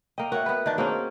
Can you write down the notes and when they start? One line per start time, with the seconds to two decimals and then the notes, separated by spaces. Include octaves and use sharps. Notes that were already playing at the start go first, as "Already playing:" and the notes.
0.18 A#3 D#5 G5
0.32 F#4 A#4 C#5 E5
0.46 B3 B4
0.66 D#3 D4
0.78 A#3 C4 C#4 F#4 G#4 C5